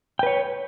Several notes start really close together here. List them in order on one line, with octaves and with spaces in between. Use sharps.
G5 B4 C#5